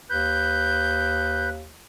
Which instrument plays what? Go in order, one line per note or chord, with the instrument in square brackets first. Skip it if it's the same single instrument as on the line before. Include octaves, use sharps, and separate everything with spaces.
[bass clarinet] D#2 [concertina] B4 [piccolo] G6